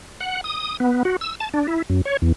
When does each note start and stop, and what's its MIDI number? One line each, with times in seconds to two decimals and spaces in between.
0.20 0.41 78
0.44 0.77 87
0.80 1.03 59
1.05 1.16 66
1.21 1.35 88
1.40 1.49 81
1.54 1.67 62
1.68 1.82 64
1.90 2.02 42
2.05 2.17 73
2.22 2.32 40